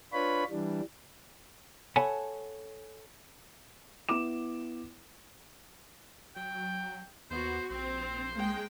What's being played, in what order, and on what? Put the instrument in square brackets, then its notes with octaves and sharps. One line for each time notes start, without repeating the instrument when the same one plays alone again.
[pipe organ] D4 F4 B4 C#5 B5
E3 G3 D4
[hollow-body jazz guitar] A4 C#5 F#5 G#5 A5 B5
[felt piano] B3 E4 D6 E7
[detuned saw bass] F#3 [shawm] G5
[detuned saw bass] D#2 [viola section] B3 F#4 [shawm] C5
[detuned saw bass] A#1 [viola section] C4 [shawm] C5
[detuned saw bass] C2 [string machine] G#3 [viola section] A#3 G5